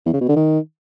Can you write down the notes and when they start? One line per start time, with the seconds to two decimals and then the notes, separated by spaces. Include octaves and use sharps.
0.06 E2
0.14 C#3
0.21 B2
0.29 D3
0.36 D#3